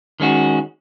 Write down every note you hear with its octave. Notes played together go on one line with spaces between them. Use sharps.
D#3 G#3 C#4 F#4